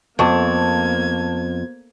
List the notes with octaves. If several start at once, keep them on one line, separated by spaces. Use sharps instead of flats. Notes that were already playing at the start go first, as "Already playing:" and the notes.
F2 A#3 B3 C5 A5 C#6 D6 G#6